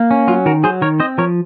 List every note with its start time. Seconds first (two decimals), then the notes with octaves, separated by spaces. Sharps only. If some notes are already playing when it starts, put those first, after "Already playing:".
Already playing: A#3
0.11 C#4
0.28 F#3 F4
0.46 D#3 F#4 A#4
0.63 F#3 G#4 C5
0.81 D#3 A#4 C#5
1.00 C4 C5 D#5
1.18 F3 A#4 C#5